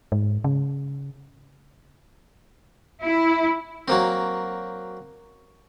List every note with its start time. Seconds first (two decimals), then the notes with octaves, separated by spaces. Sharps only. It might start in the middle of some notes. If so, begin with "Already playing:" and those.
0.12 G#2
0.44 C#3
3.01 E4
3.88 F#3 A#3 C4